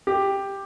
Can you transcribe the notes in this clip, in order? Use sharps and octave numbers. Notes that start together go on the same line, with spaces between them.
G4